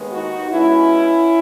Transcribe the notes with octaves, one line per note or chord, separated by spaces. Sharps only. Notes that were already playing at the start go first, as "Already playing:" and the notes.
Already playing: D#2 D#3 G#3 B3
D#4 F#4
B2 G#3 B3 C#4 E4